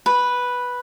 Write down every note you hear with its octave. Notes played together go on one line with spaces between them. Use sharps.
B4